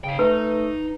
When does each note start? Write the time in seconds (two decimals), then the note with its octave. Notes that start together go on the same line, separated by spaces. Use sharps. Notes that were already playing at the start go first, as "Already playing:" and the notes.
0.04 C#3 G#4 G5
0.19 A3 D#4 B4